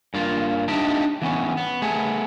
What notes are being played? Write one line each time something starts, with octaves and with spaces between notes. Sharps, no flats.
G2 A#3 F4
D4 D#4 F4 G4 D#5 E5
E3 B3 C#4
B3
A3 B3 G#4